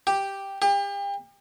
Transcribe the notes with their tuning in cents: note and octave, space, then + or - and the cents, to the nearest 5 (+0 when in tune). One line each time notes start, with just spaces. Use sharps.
G4 +0
G4 +35